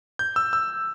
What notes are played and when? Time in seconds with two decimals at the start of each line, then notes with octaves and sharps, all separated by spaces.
0.19 G6
0.36 E6
0.53 E6